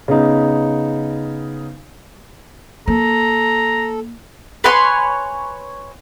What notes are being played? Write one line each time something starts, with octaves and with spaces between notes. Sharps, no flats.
C#3 B3 D#4
A#3 A4 A#5
B4 C#5 G#5 C6